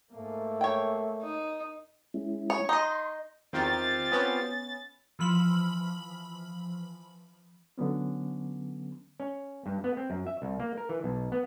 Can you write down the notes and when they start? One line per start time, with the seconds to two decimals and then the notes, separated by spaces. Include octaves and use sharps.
0.12 G#2 A3 A#3
0.61 C#5 G5
1.22 D#4
2.14 G#3 C#4 E4
2.50 C#5
2.69 D#4 D#5 C6
3.53 E2 D#3 C4 F4 G4 A6
4.12 B3 C#4
5.19 E3 F3 B5 F#7
7.78 D3 F#3 B3 C#4
9.20 C#4
9.66 G2
9.84 B3
9.97 C4
10.10 F#2
10.27 E5
10.42 C2
10.60 A#3
10.77 A#4
10.89 E3
11.04 B1
11.32 B3